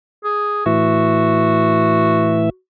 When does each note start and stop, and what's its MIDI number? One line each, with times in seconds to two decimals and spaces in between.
0.24 0.65 68
0.66 2.50 45
0.66 2.50 52
0.66 2.58 66
0.66 2.50 76